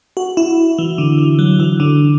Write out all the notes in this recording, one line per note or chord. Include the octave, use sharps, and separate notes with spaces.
F#4
E4
E3
D3
E3
F#3
E3
D3